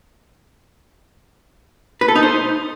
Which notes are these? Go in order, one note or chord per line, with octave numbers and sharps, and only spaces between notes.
B4
A4
D#4
C5